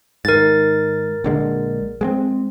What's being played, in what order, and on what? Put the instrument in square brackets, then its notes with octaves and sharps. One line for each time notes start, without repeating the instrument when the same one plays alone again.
[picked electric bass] G#2 D#3 [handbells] A#4 A6
[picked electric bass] A#1 D3 G#3
G#3 A#3 C4